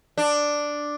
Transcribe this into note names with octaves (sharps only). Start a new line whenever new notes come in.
D4